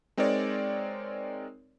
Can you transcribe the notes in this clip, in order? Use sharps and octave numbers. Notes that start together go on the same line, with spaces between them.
G#3 C4 D#4 A#4 C#5 D5